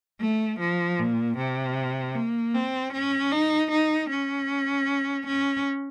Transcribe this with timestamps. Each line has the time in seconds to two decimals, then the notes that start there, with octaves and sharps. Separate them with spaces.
0.21 A3
0.60 F3
0.99 A#2
1.37 C3
2.15 A#3
2.54 C4
2.93 C#4
3.32 D#4
3.71 D#4
4.10 C#4
5.27 C#4